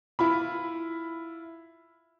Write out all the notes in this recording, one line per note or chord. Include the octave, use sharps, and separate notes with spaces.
E4 F4 B5